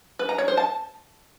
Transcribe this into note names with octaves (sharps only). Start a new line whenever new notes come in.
B4
A#5
C#5
C5
A5